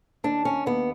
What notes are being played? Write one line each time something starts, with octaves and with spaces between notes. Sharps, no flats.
D#2 D4
C#4
D#2 B3